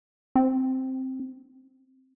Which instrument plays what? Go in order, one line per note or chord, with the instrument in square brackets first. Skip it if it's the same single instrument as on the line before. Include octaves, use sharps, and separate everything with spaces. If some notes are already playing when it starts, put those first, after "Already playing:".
[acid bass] C4